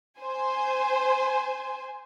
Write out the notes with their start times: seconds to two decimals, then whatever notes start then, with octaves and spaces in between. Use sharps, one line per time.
0.18 C5 G#5